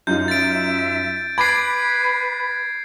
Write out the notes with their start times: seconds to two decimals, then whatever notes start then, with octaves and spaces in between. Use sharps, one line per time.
0.07 F#2 D#4 F4 G6
0.28 E5 A6 D7
1.38 B4 B5 D6 G#6 A6 C7 D7